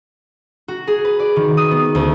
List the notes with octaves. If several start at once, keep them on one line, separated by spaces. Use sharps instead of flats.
F#4
G#4
B4
D5
D#3
D#6
B3
D2